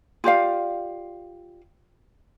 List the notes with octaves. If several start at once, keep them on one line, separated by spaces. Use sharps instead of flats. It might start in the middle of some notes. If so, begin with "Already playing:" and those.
F4 G4 D5 F5